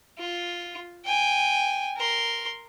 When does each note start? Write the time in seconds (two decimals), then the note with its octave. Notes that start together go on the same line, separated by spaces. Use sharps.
0.18 F4
1.05 G5 G#5
1.96 A#4 C6